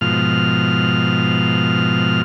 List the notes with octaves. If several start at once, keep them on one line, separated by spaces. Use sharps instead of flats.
G#2 B2 F3 F6